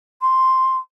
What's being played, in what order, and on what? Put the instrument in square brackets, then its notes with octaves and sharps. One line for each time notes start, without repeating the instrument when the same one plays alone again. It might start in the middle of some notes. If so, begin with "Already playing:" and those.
[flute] C6